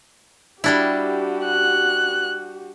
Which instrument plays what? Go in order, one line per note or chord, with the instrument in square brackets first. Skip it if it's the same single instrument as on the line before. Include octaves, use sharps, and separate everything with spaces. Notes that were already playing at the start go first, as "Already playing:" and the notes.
[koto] G3 D4 E4 [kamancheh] F#4 G4
[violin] F#6